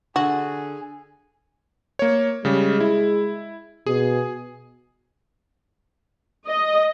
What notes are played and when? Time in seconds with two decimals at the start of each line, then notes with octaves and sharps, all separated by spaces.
0.16 D3 F#4 G#4
1.99 A#3 C#5
2.45 C#3 G3 G#3
2.80 E4
3.86 B2 G#4 G#5
6.46 D#5